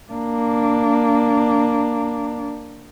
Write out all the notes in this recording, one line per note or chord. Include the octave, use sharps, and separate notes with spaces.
A#3 D4